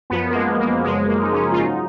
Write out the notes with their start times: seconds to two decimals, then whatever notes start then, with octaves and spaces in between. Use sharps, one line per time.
0.10 F#2 F3 B3
0.30 A#3
0.35 G#3
0.59 A#3
0.84 F#2 C#3 F3 G#3
1.08 A#3
1.22 D#4
1.33 C#4
1.52 F4
1.57 G#2 F#3 D#4